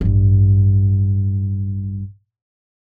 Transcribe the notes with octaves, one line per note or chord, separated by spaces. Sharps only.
A1 G2